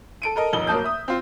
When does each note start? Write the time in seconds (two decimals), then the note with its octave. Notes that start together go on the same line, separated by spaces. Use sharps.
0.22 A4 D7 D#7
0.36 A4 A#4 D#5
0.53 D#1 F2 D#4 G7
0.67 F1 F#3 A#3 A5 D#6 G6
0.84 E5 D#6
1.08 C4 F4